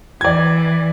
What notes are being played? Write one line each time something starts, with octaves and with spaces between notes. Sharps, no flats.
E3 D5 G#6